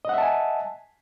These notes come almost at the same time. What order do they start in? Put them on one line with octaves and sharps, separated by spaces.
D#5 F#5 E5 A5 G#5